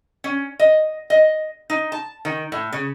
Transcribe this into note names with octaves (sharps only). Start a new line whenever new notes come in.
C#4
D#5
D#5
D#4
A5
D#3
A2
C#3